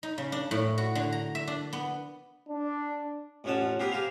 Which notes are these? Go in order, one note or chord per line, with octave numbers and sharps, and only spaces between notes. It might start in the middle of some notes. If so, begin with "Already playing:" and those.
D#4
C#3
D4
A2
F#4
D3
A#5
E5
D4
B3
D4
A1 F2 F3 C#4 F#5 A5
B3 C4 G4 G#4 A#4 B4
G4 G#4 A#4 C5 F5